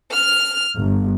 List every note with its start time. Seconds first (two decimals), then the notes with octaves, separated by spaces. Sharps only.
0.12 F6
0.76 G1